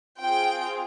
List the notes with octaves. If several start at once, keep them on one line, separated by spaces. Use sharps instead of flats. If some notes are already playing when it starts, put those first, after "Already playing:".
C4 F4 G#4 G5